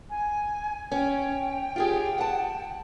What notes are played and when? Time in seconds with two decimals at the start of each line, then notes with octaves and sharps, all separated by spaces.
0.10 G#5
0.92 C#4 G5
1.76 F4 G4 G#4
2.18 F#5 A5